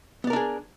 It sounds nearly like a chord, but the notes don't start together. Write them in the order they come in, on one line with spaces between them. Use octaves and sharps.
B3 D5 A#4 D4 G#4